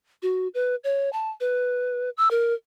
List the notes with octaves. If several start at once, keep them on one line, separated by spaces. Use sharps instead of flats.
F#4
B4
C#5
A5
B4
E6
A#4